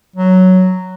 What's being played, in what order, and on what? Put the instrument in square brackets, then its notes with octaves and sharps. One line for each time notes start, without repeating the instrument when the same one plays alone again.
[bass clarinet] F#3